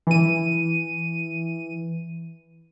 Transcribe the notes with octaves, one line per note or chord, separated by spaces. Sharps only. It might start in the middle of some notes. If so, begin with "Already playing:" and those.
E3 D#7